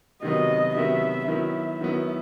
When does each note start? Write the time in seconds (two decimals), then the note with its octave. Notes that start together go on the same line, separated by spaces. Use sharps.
0.22 C3 D#3 F#3 B3 D#5
0.75 C3 D#3 F#3 B3 E5
1.27 D#3 F#3 B3 E4 E5
1.81 D#3 F#3 B3 E4